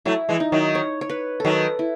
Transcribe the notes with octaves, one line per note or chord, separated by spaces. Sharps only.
F#3 A3 E4
E3 G#3
D#4
D#3 F#3
C#5
C#5
B4
D#3 F#3 A4 B4
E4